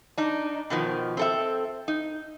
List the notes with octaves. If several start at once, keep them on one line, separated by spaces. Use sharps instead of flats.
D4 D#4
B2 D#3 F3
C4 A4 E5
D#4